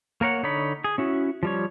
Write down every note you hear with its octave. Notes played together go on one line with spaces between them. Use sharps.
A#3 A#4 C#5 F#5
D3 D#4 C#5 B5
G#4
C#4 E4 F#4
F3 G3 C#5